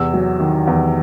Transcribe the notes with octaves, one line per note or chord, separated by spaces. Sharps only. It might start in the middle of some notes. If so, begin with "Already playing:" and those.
Already playing: E2 C3 E6
F#3
D#3
E2